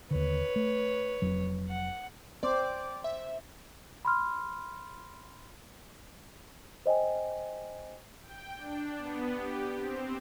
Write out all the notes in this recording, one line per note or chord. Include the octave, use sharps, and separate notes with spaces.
D#2 D3 B4 C#5
A3
F1 F2 F#3
F#5
C4 C5 D5 D6
E5
B5 C6 F6
C5 D#5 G5 G#5
G5
D4
B3
G4
C4